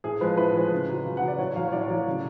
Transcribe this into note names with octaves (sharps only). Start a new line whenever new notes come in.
A2 G#4
F3 G#3 B4
A2 B4
F3 G#3
C#3
F#3
C#3
F#5
F#3
D5
A2 C#5
F#3 F5
C#5
A2 D5
F#3
C#3